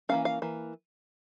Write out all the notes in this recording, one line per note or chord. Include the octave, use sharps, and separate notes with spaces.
E3 A#3 C#4 F5
F5
E3 A#3